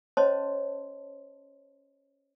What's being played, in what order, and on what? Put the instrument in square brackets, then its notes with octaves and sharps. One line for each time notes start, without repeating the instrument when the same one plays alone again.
[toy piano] C#4 C5 C#5 D#5 A5 C6